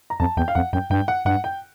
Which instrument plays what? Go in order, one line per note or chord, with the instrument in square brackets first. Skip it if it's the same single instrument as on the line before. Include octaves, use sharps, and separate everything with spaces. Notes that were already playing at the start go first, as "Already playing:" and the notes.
[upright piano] A#5
[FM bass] F2 [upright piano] A5
[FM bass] E2 [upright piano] G5
[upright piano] F5
[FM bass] F2 [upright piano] F#5
[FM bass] F#2 [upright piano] G5
[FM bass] G2 [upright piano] G5
[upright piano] F#5
[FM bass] G2 [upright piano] F#5
[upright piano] G5